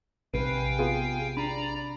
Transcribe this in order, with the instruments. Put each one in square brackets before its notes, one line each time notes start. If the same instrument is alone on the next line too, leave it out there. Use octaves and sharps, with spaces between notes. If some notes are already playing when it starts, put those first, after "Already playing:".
[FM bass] A#1 [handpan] C3 B4 [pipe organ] F5 G5 G#5
[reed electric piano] B3 F4 G#4
[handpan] D4 [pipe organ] D5 A#5 [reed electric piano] B5